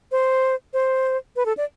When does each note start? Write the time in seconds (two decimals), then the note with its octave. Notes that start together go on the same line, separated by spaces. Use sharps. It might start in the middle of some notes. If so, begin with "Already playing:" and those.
0.12 C5
0.73 C5
1.36 B4
1.46 A4
1.57 D5